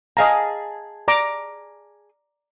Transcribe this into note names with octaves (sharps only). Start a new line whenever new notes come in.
G#4 D#5 F5 A5 A#5
D5 A#5 D6